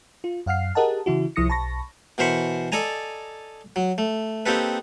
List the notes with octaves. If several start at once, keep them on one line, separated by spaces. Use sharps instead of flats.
F4
F#2 F5 F#5 F6 C7
G4 G#4 A#4 D#5 F#5 A5
C#3 E3 E4 F#4
C2 F3 E4 D#6 A#6 C#7
B1 A5 B5 C#6 A#6
B2 E3 A#4 C5 B5 C#6
A4 D5 D#5 G#5 A#5
F#3
A3
A#3 C4 D#4 G4 A4 B4